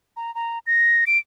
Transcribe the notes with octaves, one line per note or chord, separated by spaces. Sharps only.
A#5
A#5
A#6
D7